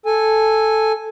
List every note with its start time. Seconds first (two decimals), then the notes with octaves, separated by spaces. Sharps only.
0.06 A4 G#5